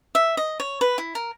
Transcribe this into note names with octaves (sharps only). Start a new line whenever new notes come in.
E5
D#5
C#5
B4
E4
A#4